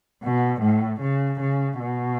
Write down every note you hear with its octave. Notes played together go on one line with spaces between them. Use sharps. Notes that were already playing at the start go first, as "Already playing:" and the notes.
B2
A2
C#3
C#3
B2